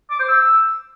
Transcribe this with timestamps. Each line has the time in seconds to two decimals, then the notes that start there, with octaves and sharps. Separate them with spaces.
0.10 D6
0.19 C5
0.28 E6